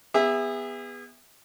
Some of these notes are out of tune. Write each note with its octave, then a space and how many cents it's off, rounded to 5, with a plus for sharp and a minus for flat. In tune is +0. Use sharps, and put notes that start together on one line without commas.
B3 +0 G#4 -35 E5 +0